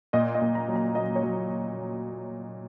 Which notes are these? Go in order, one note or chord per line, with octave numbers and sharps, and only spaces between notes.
A#2 D#5
D#5
A#2
A#5
F#3
A#5
F#3 D#5
C#5
F#3